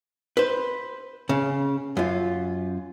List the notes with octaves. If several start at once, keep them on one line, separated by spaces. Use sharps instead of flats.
B4 C5
C#3
F#2 F4